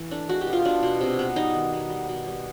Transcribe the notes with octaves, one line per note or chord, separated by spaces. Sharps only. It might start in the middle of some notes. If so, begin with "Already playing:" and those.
Already playing: E3
A3 D4
G#3 F#4
G4
B2
F4
B2 D4
B2
C3
B3
G3 D#4
D#3
B3
G3
B2
G3